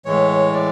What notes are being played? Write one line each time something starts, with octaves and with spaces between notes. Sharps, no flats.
A2 E3 G#3 C#5
D5